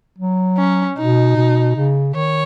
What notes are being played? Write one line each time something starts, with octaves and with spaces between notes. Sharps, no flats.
F#3
C#4
B2 D#4
B2
C#3
D#3 C#5